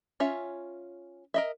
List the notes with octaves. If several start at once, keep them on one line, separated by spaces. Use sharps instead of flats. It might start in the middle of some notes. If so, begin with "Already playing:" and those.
C#4 F4 C#5 E5
A#4 D#5 E5